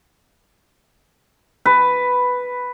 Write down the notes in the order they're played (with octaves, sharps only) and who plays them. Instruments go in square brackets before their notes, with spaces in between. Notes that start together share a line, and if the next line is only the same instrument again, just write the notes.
[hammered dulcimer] B4